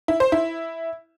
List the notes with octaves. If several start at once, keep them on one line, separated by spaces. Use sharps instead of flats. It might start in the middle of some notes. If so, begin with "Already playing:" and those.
E4
C5
E4